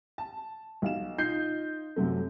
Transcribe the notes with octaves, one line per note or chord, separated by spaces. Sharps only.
A5
B1 F5 E7
D#4 F4 G6 C7
F#2 C3 F#3 A3